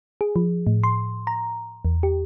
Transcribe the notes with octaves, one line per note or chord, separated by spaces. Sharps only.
G#4
F3
A2
C6
A#5
E2
G4